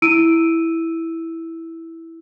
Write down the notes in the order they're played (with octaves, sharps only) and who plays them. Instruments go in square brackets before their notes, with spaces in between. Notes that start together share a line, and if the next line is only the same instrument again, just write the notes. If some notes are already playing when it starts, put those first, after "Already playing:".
[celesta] E4 E6 D7 D#7